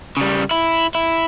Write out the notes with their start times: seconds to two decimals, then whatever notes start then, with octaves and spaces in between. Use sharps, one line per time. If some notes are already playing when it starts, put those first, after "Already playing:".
0.17 C#3 G3
0.51 E4
0.95 E4